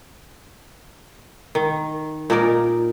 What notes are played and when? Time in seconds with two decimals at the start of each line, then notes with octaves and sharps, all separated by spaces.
1.55 D#3
2.30 A#2 D#4 A#4 D5